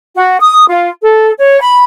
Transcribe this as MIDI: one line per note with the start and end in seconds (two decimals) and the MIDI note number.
0.16 0.37 66
0.40 0.66 87
0.69 0.90 65
1.02 1.33 69
1.39 1.60 73
1.61 1.83 83